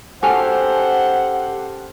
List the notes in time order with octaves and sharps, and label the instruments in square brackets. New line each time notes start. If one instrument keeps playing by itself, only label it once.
[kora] C#4 F#4 [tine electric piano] G4 A4 F6 [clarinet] C5 [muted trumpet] F#5